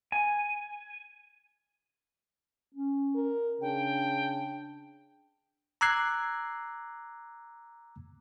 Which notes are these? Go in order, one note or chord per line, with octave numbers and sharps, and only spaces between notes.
G#5
C#4
A#4
C#3 D4 G5
A#5 D6 E6 F#6 G#6 C7